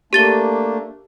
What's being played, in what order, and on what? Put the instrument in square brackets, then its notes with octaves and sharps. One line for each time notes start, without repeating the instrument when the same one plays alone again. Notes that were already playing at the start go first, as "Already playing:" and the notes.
[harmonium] A3 A#3 D4 [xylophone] G4 A6 G7